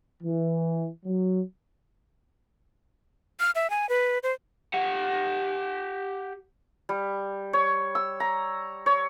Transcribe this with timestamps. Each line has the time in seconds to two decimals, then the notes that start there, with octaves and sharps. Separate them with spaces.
0.23 E3
1.05 F#3
3.40 F6
3.55 E5
3.70 G#5
3.89 B4
4.23 C5
4.74 G4 F#5
6.89 G3
7.53 C#5
7.95 E6
8.20 A#5
8.86 C#5